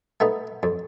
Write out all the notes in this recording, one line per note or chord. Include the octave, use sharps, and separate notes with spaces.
A3 B3 D#4
F2